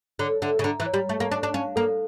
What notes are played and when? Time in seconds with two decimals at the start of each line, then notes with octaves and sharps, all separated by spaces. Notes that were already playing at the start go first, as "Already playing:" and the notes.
0.19 D3 C#5
0.42 D3 E5
0.59 C#3
0.64 D3 A#5
0.80 E3
0.86 C#5
0.94 G3
1.09 A3 C#6
1.20 A#3
1.31 D4 C#5
1.43 D4
1.54 C#4 F5
1.76 A#3 A4